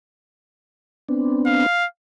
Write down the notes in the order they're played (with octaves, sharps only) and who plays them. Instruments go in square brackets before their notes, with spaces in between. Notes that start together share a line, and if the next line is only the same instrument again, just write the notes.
[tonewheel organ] B3 C4 D4
[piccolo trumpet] F5